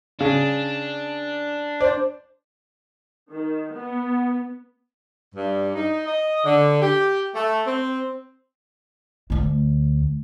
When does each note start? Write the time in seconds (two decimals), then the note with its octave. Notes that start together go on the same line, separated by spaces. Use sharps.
0.20 C#3 D4
1.81 C5 D5
3.31 D#3
3.74 B3
5.35 G2
5.75 D#4
6.07 D#5
6.44 D3
6.81 G4
7.35 A3
7.67 C4
9.30 D2 A3